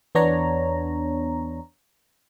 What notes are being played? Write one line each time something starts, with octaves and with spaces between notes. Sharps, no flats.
E2 B3 D4 C#5 A#5